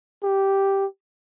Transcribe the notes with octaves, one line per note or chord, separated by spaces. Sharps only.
G4